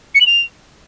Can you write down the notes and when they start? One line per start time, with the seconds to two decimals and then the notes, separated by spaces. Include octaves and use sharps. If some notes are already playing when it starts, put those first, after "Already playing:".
0.14 C#7
0.20 F#7
0.26 F7